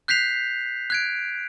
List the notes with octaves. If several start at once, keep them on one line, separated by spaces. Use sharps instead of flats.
F#6 G6 B6 C7 F7
F#6 G#6 D7